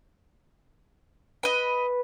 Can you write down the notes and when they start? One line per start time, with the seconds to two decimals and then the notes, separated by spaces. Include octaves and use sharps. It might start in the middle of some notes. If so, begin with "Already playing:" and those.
1.43 B4 D#5 B5